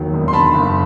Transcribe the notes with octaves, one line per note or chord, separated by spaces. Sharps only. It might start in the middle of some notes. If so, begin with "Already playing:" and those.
Already playing: E1 D#2 D#3 F#3
E1
C6
D3 A5 B5
F#1